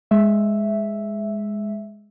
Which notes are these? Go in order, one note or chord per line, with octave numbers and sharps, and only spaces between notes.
G#3 E5